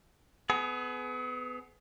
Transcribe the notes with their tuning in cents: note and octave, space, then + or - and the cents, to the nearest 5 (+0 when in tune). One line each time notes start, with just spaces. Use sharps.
B3 +25 G#4 +40